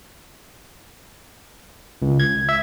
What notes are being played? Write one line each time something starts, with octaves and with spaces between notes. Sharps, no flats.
C#2
G#6
E5